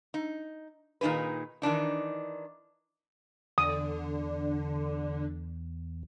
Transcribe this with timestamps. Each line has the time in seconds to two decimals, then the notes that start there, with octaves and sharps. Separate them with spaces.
0.14 D#4
1.01 A#2 D#3 D#4 G#4 B4
1.62 D#3 E3 D4 D#4
3.58 E2 D3 D#6